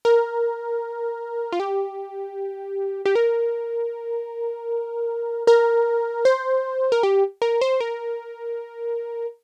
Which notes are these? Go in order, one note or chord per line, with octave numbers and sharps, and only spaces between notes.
A#4
F4
G4
G4
A#4
A#4
C5
A#4
G4
A#4
C5
A#4